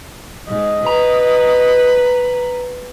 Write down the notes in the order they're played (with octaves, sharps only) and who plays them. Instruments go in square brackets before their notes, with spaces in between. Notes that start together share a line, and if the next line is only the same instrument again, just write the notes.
[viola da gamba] G#2 [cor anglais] D#5
[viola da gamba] B4 [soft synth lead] A#5